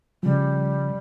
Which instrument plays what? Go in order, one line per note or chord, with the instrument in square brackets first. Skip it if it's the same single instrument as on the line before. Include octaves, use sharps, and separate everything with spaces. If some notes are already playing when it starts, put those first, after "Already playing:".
[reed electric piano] C#3 F3 [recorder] G3